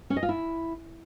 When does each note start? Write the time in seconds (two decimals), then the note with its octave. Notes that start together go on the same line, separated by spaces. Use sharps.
0.10 C#4
0.16 D#5
0.23 F4
0.29 E4